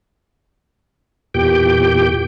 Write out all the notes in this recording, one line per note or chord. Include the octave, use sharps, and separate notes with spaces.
E2 A#2 G4 G5